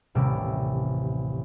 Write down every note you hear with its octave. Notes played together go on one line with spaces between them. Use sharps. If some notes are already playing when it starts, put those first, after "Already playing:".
D#1 A1 C3 G3 E5 D6